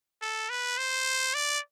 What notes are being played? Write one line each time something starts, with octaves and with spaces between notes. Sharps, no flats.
A4
B4
C5
D5